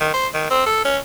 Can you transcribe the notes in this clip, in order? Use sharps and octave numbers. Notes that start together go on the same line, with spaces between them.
D#3
C5
D#3
C4
A4
C#4